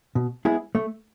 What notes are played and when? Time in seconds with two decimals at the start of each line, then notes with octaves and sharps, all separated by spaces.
0.15 B2
0.45 G#3 B3 E4 G#4
0.75 A3